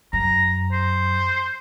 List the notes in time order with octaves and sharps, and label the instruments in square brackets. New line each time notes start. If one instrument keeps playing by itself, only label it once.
[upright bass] F#2 [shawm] A#5
[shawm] C5